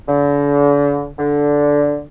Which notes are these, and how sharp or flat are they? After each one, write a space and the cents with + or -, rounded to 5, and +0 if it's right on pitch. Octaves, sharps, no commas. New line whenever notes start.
D3 -40
D3 -10